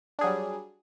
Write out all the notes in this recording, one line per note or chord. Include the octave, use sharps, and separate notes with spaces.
F#3 G3 D4 G#4